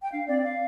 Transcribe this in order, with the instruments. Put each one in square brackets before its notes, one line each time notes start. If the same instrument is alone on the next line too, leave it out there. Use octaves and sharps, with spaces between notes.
[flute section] G5
[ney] D4 [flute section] F5
[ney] C4 [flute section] D5
[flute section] F5